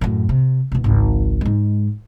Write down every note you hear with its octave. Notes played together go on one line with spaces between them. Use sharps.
F#2 A2
C3
E1 B2
G#1 C#2
G#2 G#3